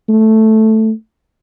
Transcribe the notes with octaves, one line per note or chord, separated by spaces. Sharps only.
A3